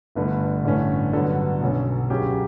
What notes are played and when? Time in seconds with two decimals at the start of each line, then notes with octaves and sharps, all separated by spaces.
0.15 G1 G2 D3 A3 B4
0.64 A1 G2 D3 A3 C#4
1.13 G2 D3 F#3 B3 A4
1.61 B1 B2 F#3 C#4
2.10 C#2 C#3 F#3 C#4 G4